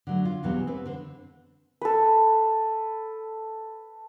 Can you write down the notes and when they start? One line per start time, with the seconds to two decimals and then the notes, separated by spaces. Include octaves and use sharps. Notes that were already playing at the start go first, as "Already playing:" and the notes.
0.07 D3 F#3 A3
0.25 F4
0.43 E2 B2 E3 F#3 G3 C4
0.67 C4 B4
0.86 D3 C5
1.82 A4 B4